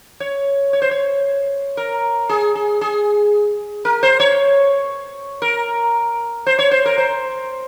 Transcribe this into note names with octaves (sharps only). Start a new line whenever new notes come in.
C#5
C#5
C5
C#5
A#4
G#4
G#4
G#4
A#4
C5
C#5
A#4
C5
C#5
C5
A#4
C5